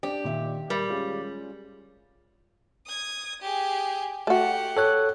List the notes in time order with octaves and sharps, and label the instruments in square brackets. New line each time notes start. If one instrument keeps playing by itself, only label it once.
[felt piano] D4 D5 [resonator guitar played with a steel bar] G4
[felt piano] A#2 D#3 E5
[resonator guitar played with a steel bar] G3 [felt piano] A#4
[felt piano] G#3 C#4 F4
[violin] D#6 G#6
G4 G#4
[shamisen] A3 F#4 [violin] G4 F#5
[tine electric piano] A4 C#5 F#6